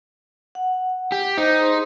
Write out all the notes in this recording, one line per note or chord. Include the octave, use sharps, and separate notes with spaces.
F#5
G4
D#4 C5
G#4 C5 C6